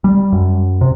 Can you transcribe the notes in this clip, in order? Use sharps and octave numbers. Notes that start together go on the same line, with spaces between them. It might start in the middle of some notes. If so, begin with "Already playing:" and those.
G3
F#2
C3